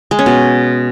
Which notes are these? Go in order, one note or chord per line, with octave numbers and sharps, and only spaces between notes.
G#3
C#4
B2